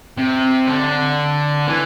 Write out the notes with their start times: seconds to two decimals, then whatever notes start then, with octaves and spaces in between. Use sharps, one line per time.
0.17 C3
0.67 D3
1.68 E3